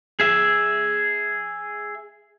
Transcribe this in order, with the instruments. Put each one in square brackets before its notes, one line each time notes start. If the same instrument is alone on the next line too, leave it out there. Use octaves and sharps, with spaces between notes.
[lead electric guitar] G#4 E5